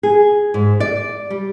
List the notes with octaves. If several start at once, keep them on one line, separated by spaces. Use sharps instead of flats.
G#4
G#2
D5
G3